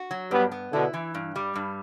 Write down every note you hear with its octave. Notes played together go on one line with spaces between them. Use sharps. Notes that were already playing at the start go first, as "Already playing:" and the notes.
Already playing: F#4
F#3
G2 G3 B3
B3
B2 D3 E4
E3
G2
G3
G2